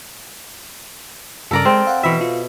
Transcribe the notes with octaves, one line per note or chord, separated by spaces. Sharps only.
G2 C#3 A4 A#4 D5 A#5
G#3 C4
F5 F#5
B2 E3 E5 B5 E6
F4